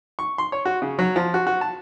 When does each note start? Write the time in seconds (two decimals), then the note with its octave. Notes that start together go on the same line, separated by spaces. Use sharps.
0.19 C#6
0.38 C6
0.52 C#5
0.65 F#4
0.82 C#3
0.99 F#3
1.16 F3
1.34 F#4
1.47 F#4
1.61 A5